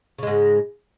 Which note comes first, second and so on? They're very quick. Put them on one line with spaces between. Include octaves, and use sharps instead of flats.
C#3 G#3 G#2